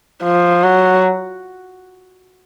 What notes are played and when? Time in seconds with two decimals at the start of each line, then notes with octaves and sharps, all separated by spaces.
0.24 F3
0.63 F#3